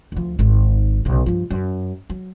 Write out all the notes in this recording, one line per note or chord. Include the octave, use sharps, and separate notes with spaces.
D2 F3
G#1 D#4
B1 C#3
G2 F3
F#2
F#3